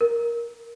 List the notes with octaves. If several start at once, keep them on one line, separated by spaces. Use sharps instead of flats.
A#4